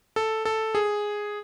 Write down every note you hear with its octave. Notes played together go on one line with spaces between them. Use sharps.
A4
A4
G#4